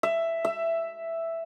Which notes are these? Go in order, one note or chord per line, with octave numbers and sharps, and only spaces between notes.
E5
E5